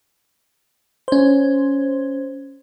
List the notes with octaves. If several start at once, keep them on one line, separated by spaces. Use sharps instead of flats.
C#4 C5